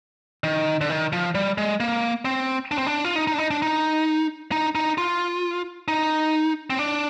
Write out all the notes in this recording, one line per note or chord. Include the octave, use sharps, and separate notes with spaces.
D#3
D3
D#3
F3
G3
G#3
A#3
C4
D4
C4
D4
F4
D#4
D#4
D4
D#4
D4
D#4
D#4
D#4
F4
D#4
C4
D4